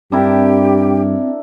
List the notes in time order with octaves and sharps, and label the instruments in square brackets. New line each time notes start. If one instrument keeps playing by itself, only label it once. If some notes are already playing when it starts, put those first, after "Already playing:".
[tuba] G2 [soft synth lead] C4 [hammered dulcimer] D4 E4 A#4 [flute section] G4 G5